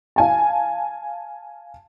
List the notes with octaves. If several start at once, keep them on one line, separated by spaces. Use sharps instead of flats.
F5 G#5 A5